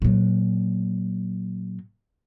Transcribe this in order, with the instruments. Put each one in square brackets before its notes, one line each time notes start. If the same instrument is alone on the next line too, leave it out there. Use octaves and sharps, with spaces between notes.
[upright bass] A#2 F#3